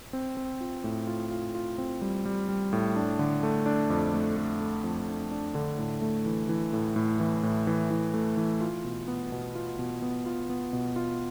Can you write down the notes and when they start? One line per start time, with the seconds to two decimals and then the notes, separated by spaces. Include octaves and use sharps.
0.13 C4
0.37 C4
0.61 F4
0.84 A2
1.07 F4
1.31 F4
1.55 F4
1.78 C4
2.02 G3
2.25 G3
2.49 G3
2.73 A2
2.96 D4
3.19 D3
3.43 A3
3.66 D4
3.90 F2
4.14 A3
4.37 A3
4.61 A3
4.84 F2
5.08 D4
5.31 D4
5.55 D3
5.78 A2
6.02 A3
6.26 E3
6.49 E3
6.73 A2
6.96 A2
7.20 E3
7.43 A2
7.67 E3
7.90 E3
8.14 A3
8.37 E3
8.61 F4
8.84 B2
9.08 B3
9.32 B2
9.55 F4
9.79 B2
10.02 B3
10.26 F4
10.50 B3
10.73 B2
10.96 F4